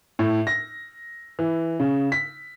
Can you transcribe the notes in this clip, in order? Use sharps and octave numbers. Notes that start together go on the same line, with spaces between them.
A2
A#6
E3
C#3
B6